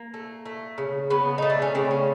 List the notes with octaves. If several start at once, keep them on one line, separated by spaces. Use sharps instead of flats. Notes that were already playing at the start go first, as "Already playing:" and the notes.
Already playing: A#3
A3
A3
C#3
C#3 B3
A3 D#4
D4
C#4
C#3 C4
C#4